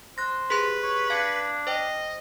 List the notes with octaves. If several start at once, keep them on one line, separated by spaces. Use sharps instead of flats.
C5 F#6 A#6
G4 G#4 B4 C6
C#5
D4 F5 G#6 C#7
C5 D#5 G5